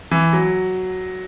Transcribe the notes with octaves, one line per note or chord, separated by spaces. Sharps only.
E3
F#3